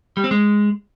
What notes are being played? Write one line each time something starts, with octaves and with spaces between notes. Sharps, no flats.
G3
C4
G#3